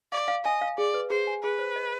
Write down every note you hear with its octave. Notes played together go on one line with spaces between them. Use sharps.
D5 F5
F5
D#5 G#5
F5
G#4 D5
B4
G#4 C5
G#5
G#4 B4
C5
D#5